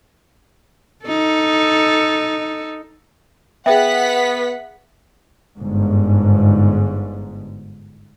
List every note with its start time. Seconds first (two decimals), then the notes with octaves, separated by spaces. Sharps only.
1.05 D#4 A4
3.66 B3 G#4 E5 F#5 G5 B6
5.58 G1 G#2